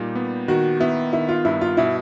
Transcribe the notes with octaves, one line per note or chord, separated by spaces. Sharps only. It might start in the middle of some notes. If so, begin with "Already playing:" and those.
Already playing: A#2 G3 D#4
B3
D#3 F#4
B3 E4
D#3 E4
F4
G2 E4
F4
B2 E4